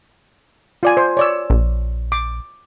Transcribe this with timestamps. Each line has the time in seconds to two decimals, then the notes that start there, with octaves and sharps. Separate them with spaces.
0.83 F4 D5 G#5
0.97 C5
1.17 C#5 D5 E6
1.50 A#1
2.12 D6